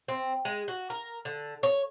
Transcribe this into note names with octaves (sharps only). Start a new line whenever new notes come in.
C4
G#3
F#4
A#4
D3
C#5